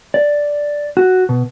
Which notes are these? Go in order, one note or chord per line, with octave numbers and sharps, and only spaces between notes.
D5
F#4
B2